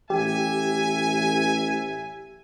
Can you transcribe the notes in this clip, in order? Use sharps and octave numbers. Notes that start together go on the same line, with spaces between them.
A1 G4 E5 G#5